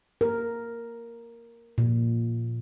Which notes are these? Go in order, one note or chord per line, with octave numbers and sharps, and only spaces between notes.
A#4
A#2